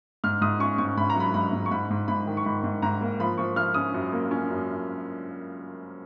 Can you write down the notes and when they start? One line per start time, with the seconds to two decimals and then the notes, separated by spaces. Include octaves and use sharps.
0.24 G#2 F6
0.41 G#2 D#6
0.60 C#4 C#6
0.78 G#2 C#6
0.97 G#2 B5
1.10 A#5
1.16 F#3 B5
1.34 G#2 B5
1.53 G#2
1.66 C#6
1.71 G#2 B5
1.90 G#2
2.08 G#2 B5
2.27 D#3
2.37 C#6
2.45 G#2 B5
2.64 G#2
2.82 G#2 A#5
3.01 A#3
3.20 F3 B5
3.38 F3 C#6
3.56 F3 F6
3.74 C#4 D#6
3.94 F#2
4.12 A#3
4.31 C#4
4.50 F#2